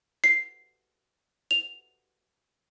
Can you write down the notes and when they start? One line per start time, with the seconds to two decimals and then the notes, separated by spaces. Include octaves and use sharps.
0.24 C7
1.51 F7